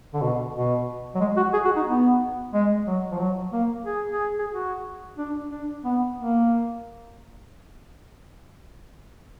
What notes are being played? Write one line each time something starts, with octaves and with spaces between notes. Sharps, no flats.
D3
B2
B2
F#3
G#3
F#4
G#4
F#4
D#4
B3
G#3
F#3
F3
F#3
A#3
G#4
G#4
G#4
F#4
D4
D4
B3
A#3